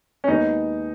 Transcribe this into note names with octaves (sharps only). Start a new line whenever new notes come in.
C#4
D#2 D#3 G#3 B3 D#4 G#4